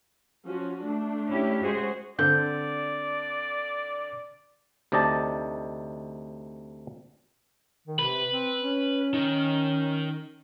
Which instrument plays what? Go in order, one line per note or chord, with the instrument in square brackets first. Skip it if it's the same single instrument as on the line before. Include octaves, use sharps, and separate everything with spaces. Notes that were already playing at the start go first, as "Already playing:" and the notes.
[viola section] F3 C#4 F#4
A3 D4
[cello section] C#4 E4 G4
[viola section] G#3 C5 [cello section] F#4 G#4
[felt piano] D3 C4 A4 [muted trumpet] D5 [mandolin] G6
[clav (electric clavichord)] D2 C3 D#4 D5 D#5 A5
[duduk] D#3
[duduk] C3 [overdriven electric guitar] B4
[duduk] C4
C#4
[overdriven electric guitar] D#3